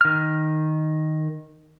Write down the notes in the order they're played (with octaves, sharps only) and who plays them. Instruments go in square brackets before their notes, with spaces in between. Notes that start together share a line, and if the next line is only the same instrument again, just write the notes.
[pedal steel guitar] D#3 F6